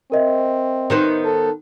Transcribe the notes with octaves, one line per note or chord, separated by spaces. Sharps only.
C4 A#4 D#5 E5
D#3 B3 C5
A4